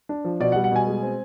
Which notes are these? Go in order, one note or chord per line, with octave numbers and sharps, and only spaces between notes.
D4
F3
B2 D5
F#5
G3
F#5
B2 G#5
G#3
C4